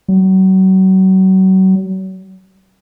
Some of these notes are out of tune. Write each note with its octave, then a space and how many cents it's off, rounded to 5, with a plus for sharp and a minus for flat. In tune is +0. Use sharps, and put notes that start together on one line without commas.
F#3 +35